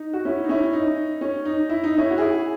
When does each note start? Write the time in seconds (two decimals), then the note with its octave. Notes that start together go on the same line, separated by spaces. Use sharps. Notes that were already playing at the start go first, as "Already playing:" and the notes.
Already playing: D#4
0.13 F#4
0.25 C#4 E4
0.44 D#4
0.49 C#4 E4
0.73 D#4
1.21 C#4
1.45 D#4
1.70 E4
1.84 D#4
1.97 C#4 E4
2.10 F#4
2.18 E4 G#4